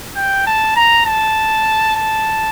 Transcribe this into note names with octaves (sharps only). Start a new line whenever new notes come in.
G5
A5
A#5
A5
A5